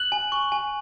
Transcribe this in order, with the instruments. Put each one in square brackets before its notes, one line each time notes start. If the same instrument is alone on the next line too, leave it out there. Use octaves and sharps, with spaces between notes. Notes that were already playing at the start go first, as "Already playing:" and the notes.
Already playing: [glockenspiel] F#6 F#7
G#5
C#6
G#5